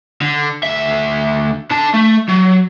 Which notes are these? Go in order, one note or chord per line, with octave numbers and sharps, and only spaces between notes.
D3
D2 E5
D3 A5
A3
F#3